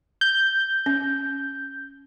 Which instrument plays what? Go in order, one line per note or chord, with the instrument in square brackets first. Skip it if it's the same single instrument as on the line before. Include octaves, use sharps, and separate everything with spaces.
[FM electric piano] G6
[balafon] C#4